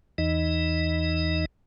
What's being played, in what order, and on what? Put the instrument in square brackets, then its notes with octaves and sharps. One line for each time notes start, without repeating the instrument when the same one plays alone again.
[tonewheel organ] E2 E3 D#4 D#5